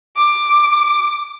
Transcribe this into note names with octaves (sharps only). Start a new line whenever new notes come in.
D6